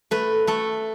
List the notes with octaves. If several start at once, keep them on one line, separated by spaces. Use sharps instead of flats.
A3 B4
A3 A4